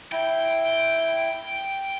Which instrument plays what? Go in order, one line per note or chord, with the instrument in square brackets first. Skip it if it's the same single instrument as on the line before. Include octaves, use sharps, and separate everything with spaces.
[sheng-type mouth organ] E4 [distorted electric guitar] G5